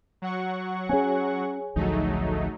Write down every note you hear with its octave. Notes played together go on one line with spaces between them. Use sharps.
F#3 F#5 C#6
C4 C#4 G#4 C#5 G#5
A1 D2 F3 F#3 A3 D#4